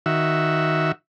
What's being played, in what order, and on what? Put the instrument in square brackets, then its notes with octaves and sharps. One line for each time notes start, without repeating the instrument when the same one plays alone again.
[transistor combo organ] D#3 F#4 E5